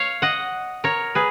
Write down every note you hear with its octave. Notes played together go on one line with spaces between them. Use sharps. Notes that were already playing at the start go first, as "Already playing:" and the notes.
Already playing: C#5 F5
D#5 F#5
A#4 C#5
G#4 B4